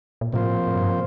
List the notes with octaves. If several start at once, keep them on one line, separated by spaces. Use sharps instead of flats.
A#2
A2 C3 F3 A#3 F4 C5
A2
G2